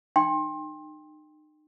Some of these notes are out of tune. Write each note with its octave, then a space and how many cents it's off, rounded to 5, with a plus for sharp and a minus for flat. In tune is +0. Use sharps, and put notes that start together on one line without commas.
D#4 -35 G5 +20 C6 +25